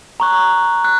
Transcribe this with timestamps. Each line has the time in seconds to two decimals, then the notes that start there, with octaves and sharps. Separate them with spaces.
0.20 A#5 C#6 F#6
0.84 F#6